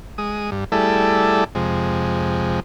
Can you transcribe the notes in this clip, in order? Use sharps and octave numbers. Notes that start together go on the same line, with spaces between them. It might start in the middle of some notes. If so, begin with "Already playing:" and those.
G#3 D#6
G2
G3 A3 E4 G#4 A4 D5
F2 C3 G#3